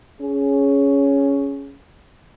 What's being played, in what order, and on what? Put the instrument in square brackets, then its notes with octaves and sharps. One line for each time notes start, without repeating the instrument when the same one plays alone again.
[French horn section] C#4 G#4